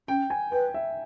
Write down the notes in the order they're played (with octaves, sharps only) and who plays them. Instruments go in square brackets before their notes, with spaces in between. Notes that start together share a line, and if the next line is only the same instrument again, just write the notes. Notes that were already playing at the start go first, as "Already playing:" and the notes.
[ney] C#4 [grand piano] G5
[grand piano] G#5
[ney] B4 [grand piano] G5
[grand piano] E5